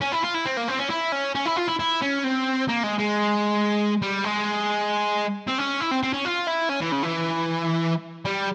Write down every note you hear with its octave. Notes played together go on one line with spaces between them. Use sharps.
C#4
E4
F4
E4
C4
A#3
C4
C#4
E4
C#4
C#4
E4
F4
E4
E4
C#4
C4
A#3
G#3
G#3
G3
G#3
C4
C#4
E4
C4
C4
C#4
F4
E4
C#4
E3
C#3
E3
G3